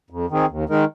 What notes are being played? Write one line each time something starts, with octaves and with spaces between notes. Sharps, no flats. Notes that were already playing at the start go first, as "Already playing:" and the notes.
F2
D#3 C4 G#4
D#2
D#3 G#3 D#4 A#4